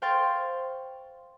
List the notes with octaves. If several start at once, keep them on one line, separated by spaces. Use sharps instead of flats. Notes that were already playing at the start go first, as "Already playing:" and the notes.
C5 F5 G5 C6 C#6 A6